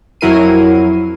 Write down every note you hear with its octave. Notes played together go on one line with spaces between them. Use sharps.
F2 F#3 E4 A#4 C7 D#7